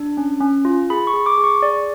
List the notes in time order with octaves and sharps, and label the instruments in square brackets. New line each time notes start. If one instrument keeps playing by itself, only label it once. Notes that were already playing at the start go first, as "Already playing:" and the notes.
Already playing: [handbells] D4
C#4
C#4
F4
G#4 B5
C#6
G#4
D6
G#4
C#6
G#4 D5